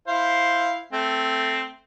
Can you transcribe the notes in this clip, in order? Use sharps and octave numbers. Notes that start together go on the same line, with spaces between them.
E4 C5 F5
A3 C4